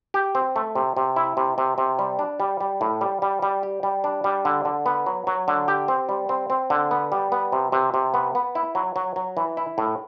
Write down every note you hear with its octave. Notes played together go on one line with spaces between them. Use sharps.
G4
C4
A3
C3
C3
E4
C3
C3
C3
G3
D4
G3
G3
A2
G3
G3
G3
G4
G3
D4
G3
D3
D3
B3
F#3
F#3
D3
G4
C4
G3
C4
C4
D3
B3
G3
B3
C3
C3
C3
B3
B3
E4
F#3
F#3
F#3
E3
E4
A2